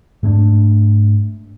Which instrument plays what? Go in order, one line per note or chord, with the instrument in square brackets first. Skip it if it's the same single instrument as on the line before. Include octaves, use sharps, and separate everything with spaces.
[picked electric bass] G#2 A3 A#3 D4